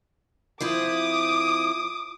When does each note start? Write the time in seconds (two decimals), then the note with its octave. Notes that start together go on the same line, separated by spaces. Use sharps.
0.60 F3 C4 E4 D6 D#6